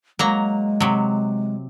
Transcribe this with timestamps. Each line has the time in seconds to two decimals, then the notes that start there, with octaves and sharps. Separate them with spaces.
0.19 F#3 G#3 A#3 A#5
0.80 C3 F#3